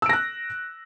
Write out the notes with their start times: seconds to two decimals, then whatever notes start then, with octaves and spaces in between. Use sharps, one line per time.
0.02 E6
0.06 D7
0.09 A#6
0.13 F#6